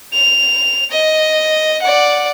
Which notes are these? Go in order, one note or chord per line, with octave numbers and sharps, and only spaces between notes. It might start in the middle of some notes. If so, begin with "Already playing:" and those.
F7
D#5
D5 F#5